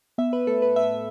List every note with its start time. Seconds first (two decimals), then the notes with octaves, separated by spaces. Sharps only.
0.18 B3 E5
0.33 B4
0.47 A2 A4
0.62 B4
0.76 A2 E5